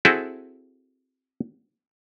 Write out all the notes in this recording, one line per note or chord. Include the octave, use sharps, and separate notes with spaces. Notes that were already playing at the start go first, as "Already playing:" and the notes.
C4 E4 F#4 G#4 A4